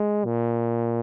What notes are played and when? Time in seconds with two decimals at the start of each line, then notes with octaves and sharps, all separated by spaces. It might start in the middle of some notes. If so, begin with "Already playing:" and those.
Already playing: G#3
0.25 A#2